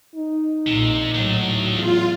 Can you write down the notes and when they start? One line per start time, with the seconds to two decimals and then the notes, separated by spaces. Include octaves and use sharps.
0.16 D#4
0.67 A#1 C3
1.14 A2 F#3 A3 D4
1.71 E2 F4